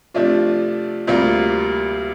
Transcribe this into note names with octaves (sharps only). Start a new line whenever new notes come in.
C3 F3 A3 D4 F4
D2 C3 G3 A#3 F4